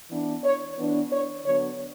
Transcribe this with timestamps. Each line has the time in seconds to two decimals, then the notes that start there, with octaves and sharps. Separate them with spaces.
0.10 E3 B3 D4
0.44 C#5
0.77 E3 B3 D4
1.11 C#5
1.45 D3 F#3 B3 D4 C#5